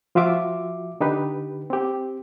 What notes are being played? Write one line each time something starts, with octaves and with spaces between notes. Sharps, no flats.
F3 F4 F#4 E5 D6
D3 D#4 G4 B4
C4 G4